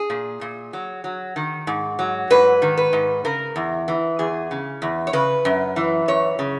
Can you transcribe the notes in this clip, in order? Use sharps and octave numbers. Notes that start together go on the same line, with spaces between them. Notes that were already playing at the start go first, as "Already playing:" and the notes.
Already playing: G#4
A#2
A#2
F#3
F#3
D#3
G#2
F#3
G#2 B4
D#3
B4
G#2
C#3 A#4
E2
E3
E2 G#4
C#3
E2
C#5
C#3 B4
F#2
E3
F#2 C#5
C#3